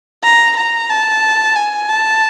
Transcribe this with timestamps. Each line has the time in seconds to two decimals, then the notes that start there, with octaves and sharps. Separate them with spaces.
0.24 A#5
0.57 A#5
0.90 A5
1.56 G#5
1.89 A5